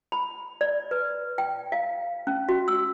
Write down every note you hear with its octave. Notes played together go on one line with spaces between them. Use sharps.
B5
D5
B4
G5
F5
C#4
F#4
E6